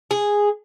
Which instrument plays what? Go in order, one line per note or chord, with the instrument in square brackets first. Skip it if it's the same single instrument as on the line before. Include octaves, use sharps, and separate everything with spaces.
[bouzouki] G#4